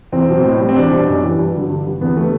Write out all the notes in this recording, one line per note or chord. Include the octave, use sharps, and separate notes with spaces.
E2 C4
B2 F#3
A2
G3
C4
E2 D4
B2 G3
F#2
E3 G3
G2
D3 F#3
G2
D3 G3
E2 B3
D3 G3 A3